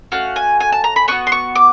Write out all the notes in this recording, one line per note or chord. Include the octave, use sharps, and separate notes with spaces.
A3 C#4 F#4 F5
G#5
G#5
A5
A#5
B5
B3 D4 F#4 C#6
C6
C#6
D6